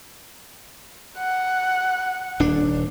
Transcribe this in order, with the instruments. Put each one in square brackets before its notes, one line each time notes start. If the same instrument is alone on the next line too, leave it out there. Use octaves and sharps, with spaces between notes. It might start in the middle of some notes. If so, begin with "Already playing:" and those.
[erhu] F#5
[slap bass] D#1 D4